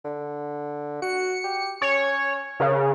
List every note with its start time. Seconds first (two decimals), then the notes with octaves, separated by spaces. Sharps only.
0.05 D3
1.02 F#4 C#7
1.44 G4
1.82 C#4 C#5
2.60 C#3 A#4